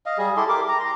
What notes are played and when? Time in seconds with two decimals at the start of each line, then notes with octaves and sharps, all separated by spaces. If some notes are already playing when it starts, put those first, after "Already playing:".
0.06 D#5 F5
0.18 G3 G#4
0.37 E4 G4 A4 C6
0.49 G4 A#4 D6
0.68 A#5
0.80 A#5 C6